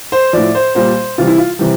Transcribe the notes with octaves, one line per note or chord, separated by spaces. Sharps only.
C5
A2 F3 D5
C5
A#2 G3 C5
C3 E3 G3 F4
E4
F4
C3 E3 G3